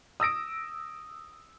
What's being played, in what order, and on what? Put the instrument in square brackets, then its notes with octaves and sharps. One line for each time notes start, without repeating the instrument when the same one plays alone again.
[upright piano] D#6 E6 A#6 D7